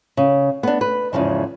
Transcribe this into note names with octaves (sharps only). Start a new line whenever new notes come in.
C#3
B3 D4
B4
E2 G#2 C#3 F3